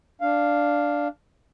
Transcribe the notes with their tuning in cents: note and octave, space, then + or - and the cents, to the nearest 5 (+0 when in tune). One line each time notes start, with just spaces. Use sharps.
D4 +0 F5 +0